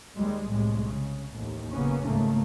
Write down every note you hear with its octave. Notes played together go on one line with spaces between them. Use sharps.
D#2 G3 G#3
C2 A2 G#3
C#3
A1 D#2
F#1 A#2 C#3 A#3 B3 C#4
G#1 C#2 G#2 C#3 A3 A#3